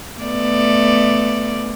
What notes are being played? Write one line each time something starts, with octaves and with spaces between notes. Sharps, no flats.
A3 B3 D5